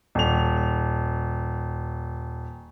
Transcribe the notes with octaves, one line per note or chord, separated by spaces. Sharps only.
D#1 F7